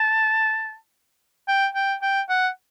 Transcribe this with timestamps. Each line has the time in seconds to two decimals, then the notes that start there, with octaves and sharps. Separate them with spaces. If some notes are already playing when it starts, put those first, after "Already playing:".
Already playing: A5
1.48 G5
1.75 G5
2.02 G5
2.29 F#5